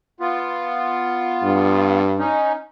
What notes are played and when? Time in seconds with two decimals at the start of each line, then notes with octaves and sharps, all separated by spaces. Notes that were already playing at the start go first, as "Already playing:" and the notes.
0.20 B3 F4
1.43 G2
2.19 C#4 D#4